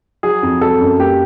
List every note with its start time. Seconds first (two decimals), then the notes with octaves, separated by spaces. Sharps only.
0.23 F#3 G#4
0.43 F2
0.61 F#3 A4
0.81 F#2
0.99 A#3 G4